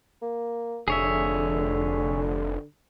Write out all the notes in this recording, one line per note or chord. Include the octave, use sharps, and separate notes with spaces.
A#3
F1 D3 G#4 C#5 E5